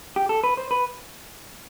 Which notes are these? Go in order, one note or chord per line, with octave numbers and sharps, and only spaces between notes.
G4
A4
B4
C5
B4